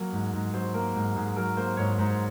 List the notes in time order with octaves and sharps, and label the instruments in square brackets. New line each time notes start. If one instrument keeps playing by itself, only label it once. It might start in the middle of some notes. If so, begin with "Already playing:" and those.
Already playing: [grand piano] F#3 A#3
G#2
G#2
F#3 C5
A#3 A#4
G#2
G#2 G#4
F#3 A#4
A#3 C5
G#2 C#5
G#2 C5